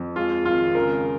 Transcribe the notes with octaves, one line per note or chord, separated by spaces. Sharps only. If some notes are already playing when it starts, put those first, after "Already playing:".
Already playing: F2
G#3 F4
G#1 F4
C#3 A#4